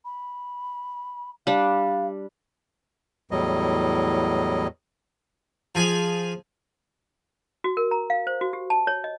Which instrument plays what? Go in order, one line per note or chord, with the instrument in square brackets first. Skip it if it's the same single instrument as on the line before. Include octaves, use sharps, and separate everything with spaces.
[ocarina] B5
[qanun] G3 D4 [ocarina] F5
[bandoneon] E2 A2 F#3 G3 D#5
[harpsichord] F3 G#4 G#5
[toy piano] F#4
A#4
A#5
F5
C5
F#4
G4
A5
C#5
D#5